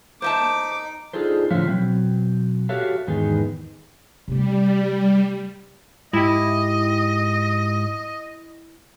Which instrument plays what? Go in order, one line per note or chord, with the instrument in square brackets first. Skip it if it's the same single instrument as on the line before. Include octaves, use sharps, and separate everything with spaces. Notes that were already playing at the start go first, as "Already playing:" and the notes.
[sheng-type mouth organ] D#4 [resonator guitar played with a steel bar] C5 E5 A5 [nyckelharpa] D6
[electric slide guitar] D4 D#4 F4 G#4 A4 C5
A2 D3 F3 C#5 E5 F5
B2 F#3 C4
F#4 G4 A4 C#5 E5 F5
E2 G#2 D#3 B3 D#4 G#4
[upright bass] C3 A3 [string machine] G3
[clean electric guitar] G#2 G4 [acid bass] E4 [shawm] D#5